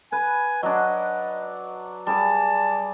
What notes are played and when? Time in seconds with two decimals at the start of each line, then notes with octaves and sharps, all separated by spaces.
0.12 B4 G#5
0.63 F#3 D4 D#5
2.07 G3 G#4 D5 A5